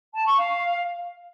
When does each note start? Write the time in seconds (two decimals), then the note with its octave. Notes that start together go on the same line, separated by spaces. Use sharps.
0.14 A5
0.26 C#6
0.38 F5